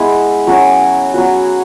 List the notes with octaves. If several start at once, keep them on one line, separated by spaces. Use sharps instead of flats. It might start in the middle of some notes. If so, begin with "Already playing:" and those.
Already playing: G#3 B3 E4 G#4
F#3 C#4 F#4 C#5
F#3 B3 F#4